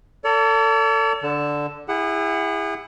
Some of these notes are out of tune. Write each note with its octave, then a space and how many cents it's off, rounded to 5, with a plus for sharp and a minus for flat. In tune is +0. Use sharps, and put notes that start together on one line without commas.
A4 +30 D5 -45
D3 +0 A5 +0
E4 +0 G#4 -40 F#5 +10